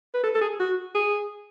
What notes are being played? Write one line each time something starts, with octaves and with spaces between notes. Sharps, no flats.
B4
A4
A4
G#4
F#4
G#4